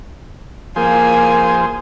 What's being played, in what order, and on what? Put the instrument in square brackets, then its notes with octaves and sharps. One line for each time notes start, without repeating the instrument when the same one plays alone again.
[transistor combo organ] F3 G#4 C5 [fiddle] A#3 G#5